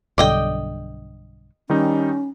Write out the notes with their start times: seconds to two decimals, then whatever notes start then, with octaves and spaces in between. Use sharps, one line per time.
0.18 B1 G2 D3 D5 D#5 G5
1.70 D#3 G3 C#4 D#4